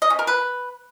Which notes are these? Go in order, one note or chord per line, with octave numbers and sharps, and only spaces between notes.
D#5
C#4
A#4
B4